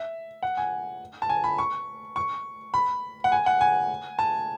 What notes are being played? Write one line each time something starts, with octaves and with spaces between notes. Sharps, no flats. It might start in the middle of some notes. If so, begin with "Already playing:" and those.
Already playing: E5
F#5
G#5
A5
G#5
B5
C#6
C#6
B5
F#5
G#5
F#5
G#5
A5